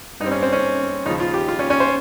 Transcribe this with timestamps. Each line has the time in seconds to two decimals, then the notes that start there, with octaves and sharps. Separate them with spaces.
0.20 G2 D#4
0.24 G3 C4
0.31 C#4
0.43 C4
0.52 C#4
1.06 D#2 C#3 F3 D#4
1.20 F4
1.34 G4
1.49 F4
1.59 C#4
1.70 C#4
1.80 C5